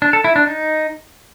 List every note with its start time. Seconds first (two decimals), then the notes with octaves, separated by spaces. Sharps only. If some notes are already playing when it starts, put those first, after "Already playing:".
0.02 D4
0.13 A4
0.24 E4
0.36 D4
0.47 D#4